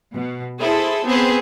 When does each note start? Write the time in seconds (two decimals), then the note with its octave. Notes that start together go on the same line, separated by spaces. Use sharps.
0.13 B2
0.59 E4 G#4 A4 C5
1.05 B3 C4 G#4 B4 C5